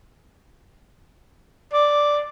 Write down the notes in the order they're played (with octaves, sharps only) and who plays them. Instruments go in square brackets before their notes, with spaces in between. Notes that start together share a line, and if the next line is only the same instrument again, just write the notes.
[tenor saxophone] D5